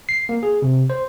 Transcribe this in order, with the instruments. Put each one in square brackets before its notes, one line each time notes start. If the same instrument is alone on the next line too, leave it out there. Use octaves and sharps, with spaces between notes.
[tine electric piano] C7
A#3
G#4
C3
C5